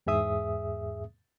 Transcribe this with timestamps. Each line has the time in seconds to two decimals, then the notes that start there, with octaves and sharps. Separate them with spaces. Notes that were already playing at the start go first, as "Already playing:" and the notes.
0.06 E2 G#2 G#4 E5 D#6